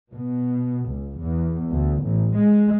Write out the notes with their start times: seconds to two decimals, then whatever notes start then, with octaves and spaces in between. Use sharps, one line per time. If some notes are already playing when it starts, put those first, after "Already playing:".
0.12 B2
0.88 C#2
1.19 E2
1.75 D2
2.06 A1
2.36 G#3